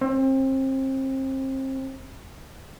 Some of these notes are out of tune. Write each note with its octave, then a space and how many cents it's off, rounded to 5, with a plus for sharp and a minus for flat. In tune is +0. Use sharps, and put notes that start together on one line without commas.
C4 +30